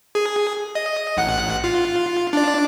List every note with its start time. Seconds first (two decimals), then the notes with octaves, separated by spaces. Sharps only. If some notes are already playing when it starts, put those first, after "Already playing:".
0.15 G#4
0.75 D#5
1.17 A1 F#5 F#6
1.64 F4
2.33 D4 D5